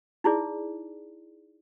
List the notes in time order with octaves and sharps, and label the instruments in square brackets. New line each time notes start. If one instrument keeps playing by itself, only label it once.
[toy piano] D#4 E4 G#4 D5